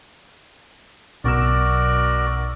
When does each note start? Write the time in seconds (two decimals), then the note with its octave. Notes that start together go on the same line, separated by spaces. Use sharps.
1.24 B1 B2 F#4 A#4 D5 E6